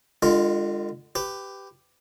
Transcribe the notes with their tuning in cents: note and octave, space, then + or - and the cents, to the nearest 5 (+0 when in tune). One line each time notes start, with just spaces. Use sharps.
D3 +35 G#3 -20 F4 +0
G4 +0 B4 +20